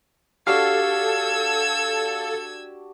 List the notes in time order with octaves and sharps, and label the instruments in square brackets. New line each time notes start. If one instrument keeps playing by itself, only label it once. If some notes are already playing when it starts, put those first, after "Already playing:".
[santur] D4 F#4 G4 [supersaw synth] A4 [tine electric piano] F5 [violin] E6 G#6